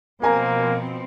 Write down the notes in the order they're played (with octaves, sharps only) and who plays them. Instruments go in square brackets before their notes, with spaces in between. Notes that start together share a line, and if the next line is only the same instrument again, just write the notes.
[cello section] B2 F3 C4 [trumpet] A#3 [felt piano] A#4 G#5 A#5